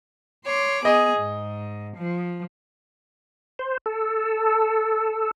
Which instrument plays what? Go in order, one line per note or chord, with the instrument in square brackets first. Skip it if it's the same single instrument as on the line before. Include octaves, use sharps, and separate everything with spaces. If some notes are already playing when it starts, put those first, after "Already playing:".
[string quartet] C#5 C6 D6
[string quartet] B3 G#4 [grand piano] D#5
[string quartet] G#2
F3
[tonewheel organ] C5
A4